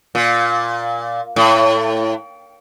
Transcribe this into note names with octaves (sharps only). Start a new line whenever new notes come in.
A#2
A2